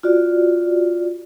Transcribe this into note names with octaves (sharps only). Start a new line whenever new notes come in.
F4 F#4 D5